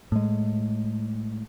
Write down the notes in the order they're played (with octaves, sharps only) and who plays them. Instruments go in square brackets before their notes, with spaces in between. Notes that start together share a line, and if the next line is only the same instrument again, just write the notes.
[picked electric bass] A2 G#3